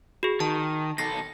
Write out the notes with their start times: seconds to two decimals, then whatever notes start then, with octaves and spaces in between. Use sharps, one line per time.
0.23 F#4 G#4
0.40 D#3 A5
0.98 B1 A4 A#6 C7